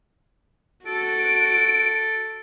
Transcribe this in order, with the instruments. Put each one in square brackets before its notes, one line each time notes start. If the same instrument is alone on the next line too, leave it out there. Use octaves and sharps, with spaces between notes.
[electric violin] F#4 D7 [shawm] A4